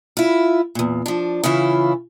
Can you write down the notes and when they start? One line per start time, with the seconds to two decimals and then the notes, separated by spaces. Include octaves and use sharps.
0.17 E4 F4
0.75 E2 A#2
1.06 F3 D4
1.44 C#3 E3 C#4 E4 F4